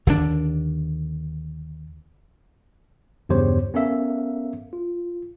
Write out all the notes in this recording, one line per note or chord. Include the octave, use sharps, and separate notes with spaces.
D#2 D3 D#3 D4
E2 G2 C#3 G4 C5 C#5
B3 C#4 A4 A#4 E5 F5
F4